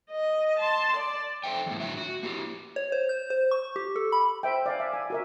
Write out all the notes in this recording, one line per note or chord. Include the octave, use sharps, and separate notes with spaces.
D#5
A5 C6
D5
A4 A#4 C5 E5 G5
E2 A2
A2 D3 F#3 E5
F#4
A#3 E4 G4
C#5
C5
G6
C5
C#6
G4
A4
B5
C5 E5 G5
D5 F5 G#5
E5
E5 G#5
F#4 A#4 E5